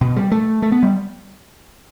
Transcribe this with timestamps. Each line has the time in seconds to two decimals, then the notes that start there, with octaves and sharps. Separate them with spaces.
0.01 B2
0.16 G3
0.32 A3
0.62 A3
0.72 B3
0.83 G3